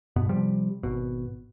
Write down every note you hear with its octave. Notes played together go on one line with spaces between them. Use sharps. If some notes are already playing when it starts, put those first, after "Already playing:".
G2 B2 B3
C3 F3 G3
G#1 B2